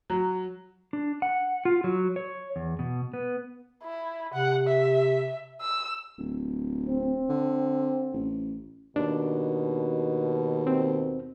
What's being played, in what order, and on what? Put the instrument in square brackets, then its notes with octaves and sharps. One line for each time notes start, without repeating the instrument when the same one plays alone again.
[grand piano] F#3
[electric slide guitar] D4
F#5
F4
F#3
C#5
E2
B2
B3
[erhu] E4
[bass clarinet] C3 [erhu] F#5
[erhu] E5
E6
[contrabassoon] D1
[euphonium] C4
[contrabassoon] D3
A1
[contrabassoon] D#2 [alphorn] B2 [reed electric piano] D4
[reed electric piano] C4